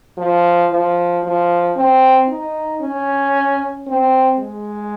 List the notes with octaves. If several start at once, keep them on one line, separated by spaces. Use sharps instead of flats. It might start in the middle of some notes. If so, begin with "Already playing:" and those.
F3
F3
F3
C4
D#4
C#4
C4
G#3